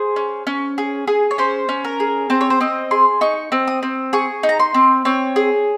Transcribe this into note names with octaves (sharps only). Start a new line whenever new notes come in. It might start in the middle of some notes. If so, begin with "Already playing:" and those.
Already playing: G#4 C5
C#4
C#4
G#4
G#4
C#5
C#4 C5
C#4
A#4
G#4
C4 C5
C#5
C5
C4 D#5
G#4 C6
D#4 C#6
C4
D#6
C4
G#4 C#6
D#4
A#5
C6
C4
C4 C#5
G#4